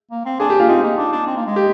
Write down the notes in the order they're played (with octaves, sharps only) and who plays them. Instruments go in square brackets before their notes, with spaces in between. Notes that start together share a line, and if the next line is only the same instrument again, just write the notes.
[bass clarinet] A#3
C4
[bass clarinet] D4 [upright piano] G#4
[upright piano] G4
[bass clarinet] A#3 [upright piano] F4
[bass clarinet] C4 [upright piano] D#4
[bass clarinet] A#3
D4
D4
C4
A#3
G#3
[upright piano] G4